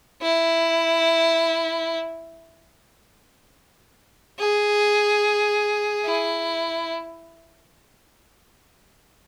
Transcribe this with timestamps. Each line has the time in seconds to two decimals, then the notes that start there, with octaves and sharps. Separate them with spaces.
0.22 E4
4.39 G#4
6.05 E4